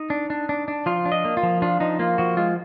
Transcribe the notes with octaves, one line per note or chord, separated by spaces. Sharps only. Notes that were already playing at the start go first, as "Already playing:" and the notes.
Already playing: D#4
D4
D4
D4
D4
F3 F4
D4
D#5
A#3
F4
F3
D4 F4
F3 D#4
A#3 F4
F3 F#4
G#3 F4